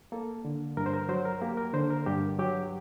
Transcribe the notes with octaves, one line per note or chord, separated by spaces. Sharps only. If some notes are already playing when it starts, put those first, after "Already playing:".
A#3 A4
D3
G2 A#4
C5
A#4
F#3 C5
A#4
A#3 G4
A#4
D3 C5
A#4
G2 G4
F#3 G4